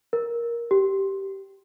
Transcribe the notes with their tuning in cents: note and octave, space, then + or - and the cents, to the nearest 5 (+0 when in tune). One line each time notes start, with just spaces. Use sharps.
A#4 +10
G4 -10